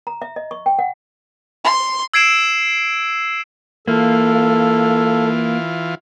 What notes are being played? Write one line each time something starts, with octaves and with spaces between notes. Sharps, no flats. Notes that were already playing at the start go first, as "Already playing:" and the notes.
A#5
E5
D#5
C#6
G5
F#5
C6
E6 G#6 C7 D7 E7
E3 A#3 F4 A4